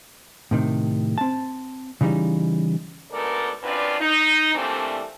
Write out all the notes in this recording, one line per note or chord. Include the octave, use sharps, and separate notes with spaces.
A2 C3 D#3
C4 A5
C#3 E3 G3 D#4
D2 G#2 B3 A4 A#4 D5
F#2 C4 D4 F4 B4 D5
D#4
E3 G3 A3 A#3 C4 D4